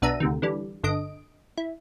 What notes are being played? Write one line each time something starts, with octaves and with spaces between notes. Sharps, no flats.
B1 B3 D4 E5 A#5 D#7
D2 C3 D#3
D3 E3 G3
G1 D3 D#5 D7
E4